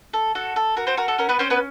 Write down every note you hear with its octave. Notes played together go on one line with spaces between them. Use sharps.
A4
F#4 A4
A4
F#4 A#4
C4 C5
F#4 A#4
A4
C#4 A#4
B3 B4
C4 C#4 C5
B3 B4